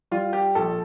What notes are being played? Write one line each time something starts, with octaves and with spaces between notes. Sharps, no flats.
G3 F4
G4
A#1 A4